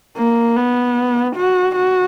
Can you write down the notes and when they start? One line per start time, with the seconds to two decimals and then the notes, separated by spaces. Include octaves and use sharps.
0.17 A#3
0.56 B3
1.36 F#4
1.75 F#4